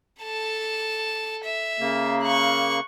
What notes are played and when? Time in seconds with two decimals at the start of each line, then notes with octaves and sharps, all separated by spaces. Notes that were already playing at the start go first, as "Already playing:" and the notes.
0.23 A4 A5
1.44 E5
1.79 C#3 A#3
2.24 C#6 F#6